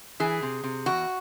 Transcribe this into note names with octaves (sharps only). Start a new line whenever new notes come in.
E3 G#4
C3
C3
E2 F#4